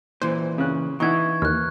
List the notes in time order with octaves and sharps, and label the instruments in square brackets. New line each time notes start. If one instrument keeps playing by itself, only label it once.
[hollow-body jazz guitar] A#2 E3 [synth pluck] C5
[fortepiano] C#3 F#6
[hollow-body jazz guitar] E3 [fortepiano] D#4 E4 F#5 [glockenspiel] C#6 G#6
[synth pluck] D#2 [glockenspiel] F6 F#6